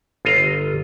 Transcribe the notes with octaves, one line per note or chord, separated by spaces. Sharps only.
G1 F4 D#5 A#5